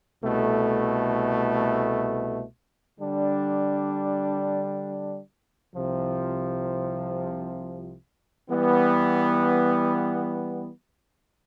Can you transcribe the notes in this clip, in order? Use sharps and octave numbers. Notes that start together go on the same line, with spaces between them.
C2 B2 A3
D3 G3 D4
C2 C3 F3
E3 G3 B3